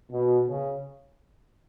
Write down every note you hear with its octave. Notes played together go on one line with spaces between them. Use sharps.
B2
C#3